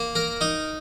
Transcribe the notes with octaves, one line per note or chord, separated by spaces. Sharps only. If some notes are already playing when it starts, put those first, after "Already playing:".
Already playing: A#3
A#4
D#4